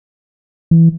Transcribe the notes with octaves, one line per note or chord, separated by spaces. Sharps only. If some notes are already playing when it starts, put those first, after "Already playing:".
E3